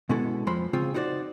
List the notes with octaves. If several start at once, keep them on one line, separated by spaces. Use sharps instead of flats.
B2 G#3 B3 C#4 E4 A4
F2 F3 G#3 C5 B5 C6
C#3 C4 F4 G#4
D#4 E4 F#4 C5 D5